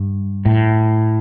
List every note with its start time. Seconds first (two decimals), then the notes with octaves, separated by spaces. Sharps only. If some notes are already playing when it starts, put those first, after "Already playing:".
Already playing: G2
0.45 A2